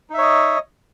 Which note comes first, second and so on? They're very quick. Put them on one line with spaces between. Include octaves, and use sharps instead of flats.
D#4 E5 C#5 D#5